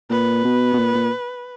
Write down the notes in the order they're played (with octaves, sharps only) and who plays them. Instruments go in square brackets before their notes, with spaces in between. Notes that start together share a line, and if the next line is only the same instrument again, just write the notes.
[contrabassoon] A#2 [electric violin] B4
[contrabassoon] B2
B2
A#2
A#2